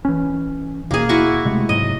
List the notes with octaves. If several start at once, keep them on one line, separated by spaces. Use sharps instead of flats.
E3 C#4
D#2 B2 A#3 G#4
E4 F#4 C#6
C3 G#3 A3
G#2 C3 F#3 D#5